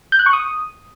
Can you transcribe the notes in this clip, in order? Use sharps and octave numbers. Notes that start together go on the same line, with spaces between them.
G6
F#6
C#6
D#6